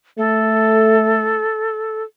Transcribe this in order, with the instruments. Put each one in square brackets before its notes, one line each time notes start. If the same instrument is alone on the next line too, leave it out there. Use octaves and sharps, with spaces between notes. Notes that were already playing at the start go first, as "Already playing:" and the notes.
[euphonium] A3 [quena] A4